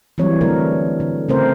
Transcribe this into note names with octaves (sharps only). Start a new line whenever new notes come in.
E3 F#3 G3 C4 C#5
D3 F#3 A3 A#4
D3
C#3 A3 C4 A#4 C5